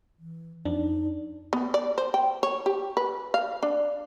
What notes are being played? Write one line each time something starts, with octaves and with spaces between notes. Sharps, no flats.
E3
F2 D4 D#4
B3
D5
C5
G5
C#5
G4
B4
F5
D4